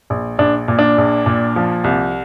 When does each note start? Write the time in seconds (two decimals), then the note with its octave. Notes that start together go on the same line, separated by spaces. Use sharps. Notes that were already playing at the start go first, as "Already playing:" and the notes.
0.10 A#1
0.39 A#1 D4
0.68 A#2
0.79 D4
0.98 A#1
1.26 A#2
1.56 F3
1.84 C2